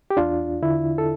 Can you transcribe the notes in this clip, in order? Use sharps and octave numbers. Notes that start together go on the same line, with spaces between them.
G4
E2 D4 F4
D3 E4
A4